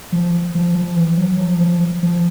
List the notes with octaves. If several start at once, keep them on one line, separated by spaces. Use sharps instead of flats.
F3
F3
F3
E3
F#3
F3
F3
F3